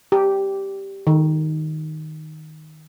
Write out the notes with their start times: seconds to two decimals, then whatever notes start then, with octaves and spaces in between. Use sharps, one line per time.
0.12 G4
1.07 D#3